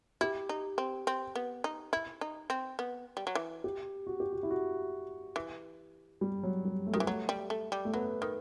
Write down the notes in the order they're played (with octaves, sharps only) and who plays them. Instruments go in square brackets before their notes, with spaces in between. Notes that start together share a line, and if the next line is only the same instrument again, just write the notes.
[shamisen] E4 [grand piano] G4
[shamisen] D#4
C4
C4
B3
D#4
E4
D#4
C4
B3
G3
F#3
E3
[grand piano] G4
F#4
G4
F#4
E4
F#4
[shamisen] E3
[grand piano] G3
F#3
G3
A3
[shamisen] D#3
[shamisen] E3 [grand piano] G3
[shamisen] F#3 [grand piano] A3
[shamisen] G3
A3
G3
[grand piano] A3
[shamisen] F#3 [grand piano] B3
[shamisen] D#3